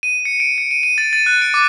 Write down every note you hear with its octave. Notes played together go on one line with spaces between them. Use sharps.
D#7
C#7
D7
C#7
D#7
D#7
A6
A6
F#6
D7
D6